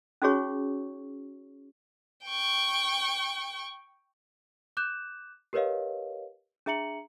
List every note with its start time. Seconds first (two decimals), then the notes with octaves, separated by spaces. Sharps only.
0.22 C#4 D#4 F#4 G#4 C#5 C#6
2.25 G5 C#6
4.77 D6 F#6 G6 E7
5.53 G4 A#4 B4 C#5 D#5 F5
6.66 D4 G#4 E5 A#5 C#7 F#7